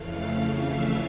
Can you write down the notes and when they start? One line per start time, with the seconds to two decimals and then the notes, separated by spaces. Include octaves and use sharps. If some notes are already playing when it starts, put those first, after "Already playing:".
Already playing: F2 C#3 E3 A3 F5
0.53 E5